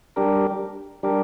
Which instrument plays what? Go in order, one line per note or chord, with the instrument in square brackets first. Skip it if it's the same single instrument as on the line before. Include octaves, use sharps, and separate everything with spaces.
[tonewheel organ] G3 D4 G4 A#4
G3 D4 G4 A#4